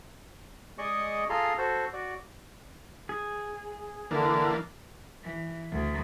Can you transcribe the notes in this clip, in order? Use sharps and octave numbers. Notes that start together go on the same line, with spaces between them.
G#3 G#4 D5 D#5 C#6
F4 G#4 A4 A#5 C6
F#4 A4 C5
F#4 D5
G#4
D3 E3 A#3 D4
E3
D2